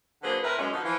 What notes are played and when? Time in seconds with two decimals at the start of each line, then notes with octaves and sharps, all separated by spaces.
0.23 D3 F#3 A#3 G#4 B4 C5
0.42 A2 C4 E4 A#4 B4
0.58 F#2 G#3 C#4
0.71 D3 F3 F#3 B3 D#4
0.84 E3 F3